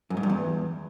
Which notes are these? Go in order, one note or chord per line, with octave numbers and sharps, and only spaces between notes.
F#2
G#2
G2
E2